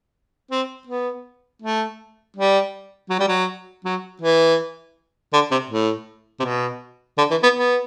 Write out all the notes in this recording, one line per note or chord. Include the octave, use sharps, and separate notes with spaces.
C4
B3
A3
G3
F#3
G3
F#3
F#3
E3
D3
C3
A2
C3
B2
D3
E3
B3
B3